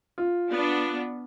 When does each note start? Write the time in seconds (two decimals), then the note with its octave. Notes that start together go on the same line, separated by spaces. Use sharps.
0.18 F4
0.51 B3 D4